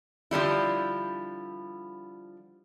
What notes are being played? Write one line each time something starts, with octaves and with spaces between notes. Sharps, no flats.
D3 F3 G3 E4